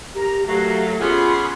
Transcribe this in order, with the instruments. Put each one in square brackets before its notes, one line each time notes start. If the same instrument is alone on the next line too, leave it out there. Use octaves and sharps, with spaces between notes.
[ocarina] G4 [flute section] A#4 A#5
[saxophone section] F#3 A3 [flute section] F#4 A#4 F5 [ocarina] G4
[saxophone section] B3 C#4 G#4 [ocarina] F4 [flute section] B5 C6 D6